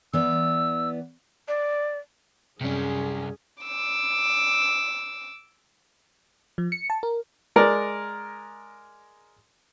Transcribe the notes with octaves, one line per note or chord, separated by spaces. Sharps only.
E3 B3 D5 E6
D5
F#2 C3 G3 C#4 G#4
D6 E6
F3
C#7
A5
A#4
G#3 A#4 D5